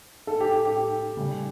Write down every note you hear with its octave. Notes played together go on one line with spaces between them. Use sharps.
A4
G4
G4
C#3 G3